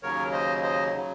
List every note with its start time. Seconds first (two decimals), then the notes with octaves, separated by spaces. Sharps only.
0.03 D#2 C#3 F#3 A#4 C#5
0.32 C5 D#5
0.63 C5 D#5
0.94 C#3 F#3